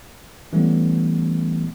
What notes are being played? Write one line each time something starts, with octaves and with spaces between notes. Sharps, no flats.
E3 G3 A3 B3 C#4